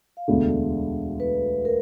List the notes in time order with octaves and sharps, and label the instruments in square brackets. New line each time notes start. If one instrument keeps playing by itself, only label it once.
[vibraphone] F5
[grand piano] E1 D2 D3 [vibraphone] E5
[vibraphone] B4
A#4